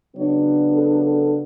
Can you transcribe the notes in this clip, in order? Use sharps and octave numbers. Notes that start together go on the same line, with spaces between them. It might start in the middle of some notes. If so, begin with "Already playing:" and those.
C#3 F#3 B3 D4 C#5
A4
A4